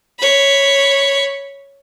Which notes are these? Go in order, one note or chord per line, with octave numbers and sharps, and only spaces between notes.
C#5 B5